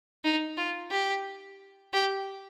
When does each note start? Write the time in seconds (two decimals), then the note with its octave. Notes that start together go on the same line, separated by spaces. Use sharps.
0.24 D#4
0.57 F4
0.91 G4
1.93 G4